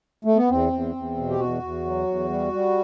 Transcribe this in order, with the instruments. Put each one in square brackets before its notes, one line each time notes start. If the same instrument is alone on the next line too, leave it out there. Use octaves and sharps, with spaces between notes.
[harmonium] A3
B3
E2 C4
E2
E2
B2
G4
E2 F#4
E2
F#3
E2
G3
G3